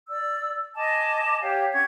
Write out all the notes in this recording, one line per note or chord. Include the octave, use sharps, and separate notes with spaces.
D5 E6
D#5 G#5 A5 D6
G4 C#5 F5 G5
C#4 F#5 G#6